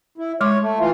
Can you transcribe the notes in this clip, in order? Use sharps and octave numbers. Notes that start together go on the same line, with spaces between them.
E4
G#3 C#5 C6 D6
A3
E3 F4